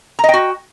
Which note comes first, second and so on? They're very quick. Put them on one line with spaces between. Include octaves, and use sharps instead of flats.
A#5 D#5 G5 F#4